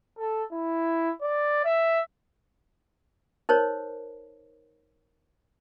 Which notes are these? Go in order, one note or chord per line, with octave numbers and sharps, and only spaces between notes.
A4
E4
D5
E5
D#4 A#4 C5 C#5